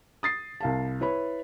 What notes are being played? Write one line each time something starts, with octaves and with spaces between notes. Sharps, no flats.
D#6 A6 C7
C2 F5 A5
E4 B4 C#5 B5